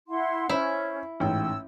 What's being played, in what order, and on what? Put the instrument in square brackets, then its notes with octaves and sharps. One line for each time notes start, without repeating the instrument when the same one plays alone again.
[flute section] E4 F#5 C6
[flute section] C#4 [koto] E4 [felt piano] C5
[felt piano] A1 G#2 G5 [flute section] E6